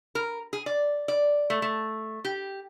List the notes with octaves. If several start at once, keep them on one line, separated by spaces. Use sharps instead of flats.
A#4
G#4
D5
D5
A3
A3
G4